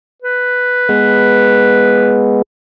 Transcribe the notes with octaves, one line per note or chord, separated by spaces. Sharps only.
B4
G#3 B3